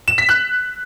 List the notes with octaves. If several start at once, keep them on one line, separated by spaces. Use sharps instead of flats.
E7
B6
F#6